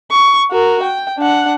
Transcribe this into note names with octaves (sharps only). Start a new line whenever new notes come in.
C#6
F#4 A#4
G5
D4 F#5